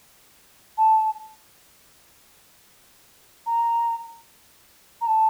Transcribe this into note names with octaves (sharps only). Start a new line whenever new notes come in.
A5
A#5
A#5
A5